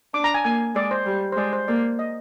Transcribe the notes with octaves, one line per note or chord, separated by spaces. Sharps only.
D4 D6
A#5
G#5
A#3 G#5
G#3 D5
C5
G3
C5
G#3 D5
C5
A#3 D5
D#5